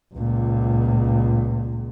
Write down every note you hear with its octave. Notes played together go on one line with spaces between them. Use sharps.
C#2 A#2